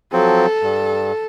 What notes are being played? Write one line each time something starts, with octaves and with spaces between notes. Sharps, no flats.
F3 F#3 C4 A4
G2